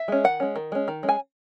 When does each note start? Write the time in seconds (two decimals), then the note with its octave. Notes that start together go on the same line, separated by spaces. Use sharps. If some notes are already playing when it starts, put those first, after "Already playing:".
Already playing: E5
0.08 G#3 C#4
0.24 D#3 F#5
0.40 G#3 C#4
0.56 D#3
0.72 G#3 C#4
0.88 D#3
1.03 G#3 C#4
1.09 G#5